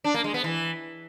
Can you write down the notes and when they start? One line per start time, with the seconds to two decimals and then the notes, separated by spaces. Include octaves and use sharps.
0.04 D4
0.14 A#3
0.24 G#3
0.34 B3
0.44 E3